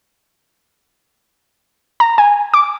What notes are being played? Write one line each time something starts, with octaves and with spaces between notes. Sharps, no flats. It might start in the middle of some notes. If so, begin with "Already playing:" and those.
A#5
G#5
D6